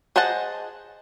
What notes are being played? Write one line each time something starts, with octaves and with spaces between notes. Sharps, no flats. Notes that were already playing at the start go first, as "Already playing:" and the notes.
G#4 C5 D#5 F#5 A5